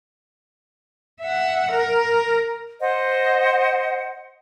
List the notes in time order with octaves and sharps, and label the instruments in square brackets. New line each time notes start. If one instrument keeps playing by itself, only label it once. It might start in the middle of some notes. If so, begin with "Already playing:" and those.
[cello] E5 F#5
A#4
[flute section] C5 D#5 F#5